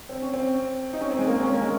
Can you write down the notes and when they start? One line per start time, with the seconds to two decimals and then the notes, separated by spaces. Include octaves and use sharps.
0.09 C4
0.22 C#4
0.34 C4
0.93 D#4
1.01 C#4
1.11 C4
1.19 G#3
1.27 A#3
1.35 C4
1.43 C#4
1.52 A#3
1.61 G#3